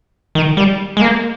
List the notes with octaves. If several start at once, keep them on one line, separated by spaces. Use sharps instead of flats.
D#3
G3
G#3
A#3